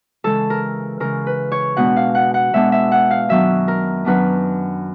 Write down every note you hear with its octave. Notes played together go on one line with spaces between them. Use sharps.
C#3 E3 G#3 A4
A#4
C#3 E3 G#3 A#4
B4
C#5
B2 G#3 B3 D4 F#5
F5
F#5
F#5
B2 G#3 B3 D4 E5
E5
F#5
F5
F#2 D#3 F#3 B3 D4 E5
A#4
F#2 D#3 F#3 B3 D4 B4